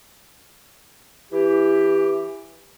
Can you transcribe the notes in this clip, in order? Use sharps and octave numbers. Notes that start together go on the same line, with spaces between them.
E3 E4 G4